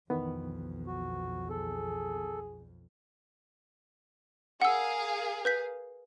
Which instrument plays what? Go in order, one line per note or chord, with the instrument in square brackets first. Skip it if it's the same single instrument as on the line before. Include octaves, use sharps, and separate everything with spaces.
[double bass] B1 F2 [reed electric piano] D#3 E3 B3
[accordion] F#4
[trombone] G#4 [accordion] A4
[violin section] G#4 A#4 F5 [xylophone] F#5 E6
[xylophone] B4 G6 B6